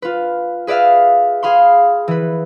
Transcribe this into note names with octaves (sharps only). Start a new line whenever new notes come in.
F4 B4
G#4 B4 D5 E5 F5
G#4 F5 B5 C6
E3 B4